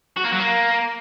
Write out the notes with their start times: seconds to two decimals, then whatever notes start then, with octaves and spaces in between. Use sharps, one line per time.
0.17 F#4
0.24 A#3
0.32 F#3
0.39 A#3